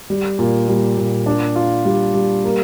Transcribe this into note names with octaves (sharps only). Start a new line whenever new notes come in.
G3
A#2
G3
A#2
D4
F4
G3
G3
A#3